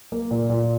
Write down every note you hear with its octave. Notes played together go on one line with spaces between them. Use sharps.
A#3
A#2
A#2